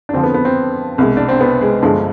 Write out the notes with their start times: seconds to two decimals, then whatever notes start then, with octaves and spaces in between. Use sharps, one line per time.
0.09 D4
0.13 F2 D3 F3 C4
0.23 B3
0.34 B3
0.45 C4
0.98 C2 B2 G#3
1.17 D4
1.29 C4
1.41 B3
1.61 G#3
1.82 G1 G2 D3 F3 G#3